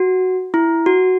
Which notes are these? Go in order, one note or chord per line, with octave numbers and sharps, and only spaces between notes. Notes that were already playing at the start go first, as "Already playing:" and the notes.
Already playing: F#4
E4
F#4